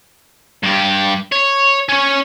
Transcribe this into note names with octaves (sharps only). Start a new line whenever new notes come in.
G2 G4
C#5
C#4 C#5